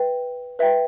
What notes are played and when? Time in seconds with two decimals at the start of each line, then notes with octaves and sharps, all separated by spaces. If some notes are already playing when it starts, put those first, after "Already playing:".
Already playing: B4 E5 G5
0.59 B4 E5 G5